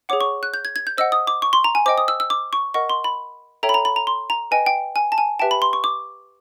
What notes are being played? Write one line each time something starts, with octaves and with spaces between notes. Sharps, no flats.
G#4 C#5 F#5 D6
C#6
F#6
G6
G#6
G#6
G6
C5 D#5 F#5 E6
D#6
D6
C#6
C6
A#5
G#5
C5 D#5 G5 D6
D#6
E6
E6
D6
C#6
A#4 D#5 F#5 C#6
C6
B5
A4 C#5 E5 G5 A#5
B5
A#5
B5
A#5
C6
A#5
B4 D#5 G5 G#5
G5
G#5
A5
G#5
G4 B4 E5 G5 A5
B5
C6
C#6
D6